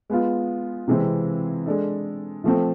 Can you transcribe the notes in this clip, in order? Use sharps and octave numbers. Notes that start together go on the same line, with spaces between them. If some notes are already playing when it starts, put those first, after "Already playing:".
G#3 B3 F4
C3 E3 G#3 C4
G#3 D4 A4
F3 A3 C4